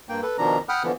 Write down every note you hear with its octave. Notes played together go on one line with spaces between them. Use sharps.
G2 A#3 G5
A4 B4
B2 D#3 F3 D4 A#5
F#5 G5 B5 D#6 F6 F#6
D3 E3 F3 B3